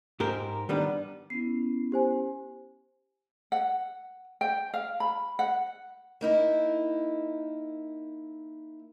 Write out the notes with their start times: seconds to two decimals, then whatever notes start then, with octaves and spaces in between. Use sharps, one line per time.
0.20 G#2 G4 A#4 C5
0.69 D#3 G3 B3 D4
1.30 B3 C#4 E4 C7
1.92 G4 C5 G#5
3.52 F#5
4.41 G5
4.74 F5
5.00 B5
5.39 F#5
6.21 A#3 D#4 E4